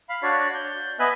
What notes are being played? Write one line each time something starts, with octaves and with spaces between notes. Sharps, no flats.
F5 B5
D4 F#4 C#5 D5
G6
B3 B4 D#5 E5 G#5 F#6